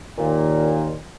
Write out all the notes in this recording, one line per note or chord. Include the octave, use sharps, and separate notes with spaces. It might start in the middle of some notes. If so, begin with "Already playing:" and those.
D#2 A#2